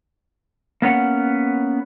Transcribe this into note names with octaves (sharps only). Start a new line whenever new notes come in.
A#3 B3 C#4 F#5